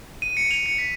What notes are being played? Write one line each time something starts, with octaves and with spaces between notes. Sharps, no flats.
D#7
C#7
F7
C#7
B6